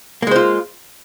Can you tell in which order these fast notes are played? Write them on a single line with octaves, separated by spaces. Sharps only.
A#3 G#3 C5 F4